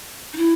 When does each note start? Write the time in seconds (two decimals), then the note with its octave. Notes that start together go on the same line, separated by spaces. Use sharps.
0.33 D#4
0.37 E4